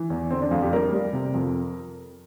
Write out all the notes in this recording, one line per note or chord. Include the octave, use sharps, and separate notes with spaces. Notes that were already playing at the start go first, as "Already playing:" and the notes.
Already playing: E3
E2
D3 C4
D4
F2 F4
G4
G3 A#4
G3
C3
F2